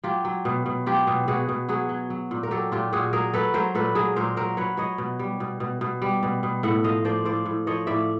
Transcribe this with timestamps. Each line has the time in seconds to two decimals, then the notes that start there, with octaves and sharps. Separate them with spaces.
0.04 F#3 F4 G4
0.25 F#3
0.45 B2
0.66 B2
0.86 F#3 F4 G4
1.07 B2
1.28 B2 F#4 G#4
1.49 B2
1.69 F#3 F#4 G#4
1.89 F#3
2.10 F#3
2.31 A#2
2.43 A#4
2.51 F#3 G4 A4
2.72 A#2 F4 G4
2.93 A#2 F#4 G#4
3.13 F#3 G#4 A#4
3.33 F#3 A4 B4
3.54 F#3 A#4 C5
3.75 A#2 A4 B4
3.95 F#3 G#4 A#4
4.16 A#2 A#4 C5
4.37 F#3 A#4 C5
4.57 F#3 B4 C#5
4.77 F#3 C#5 D#5
4.98 B2
5.19 G3
5.40 B2
5.60 B2
5.81 B2
6.02 G3
6.23 B2
6.43 B2
6.63 A2 E5 F#5
6.84 F3 D#5 F5
7.05 F3 C5 D5
7.25 A2 C5 D5
7.46 A2
7.67 F3 C#5 D#5
7.87 A2 D5 E5